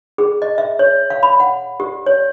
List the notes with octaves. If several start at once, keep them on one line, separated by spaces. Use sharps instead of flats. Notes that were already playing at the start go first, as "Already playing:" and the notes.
G#4
D#5
E5
C#5
F5
B5
F#5
G4
C#5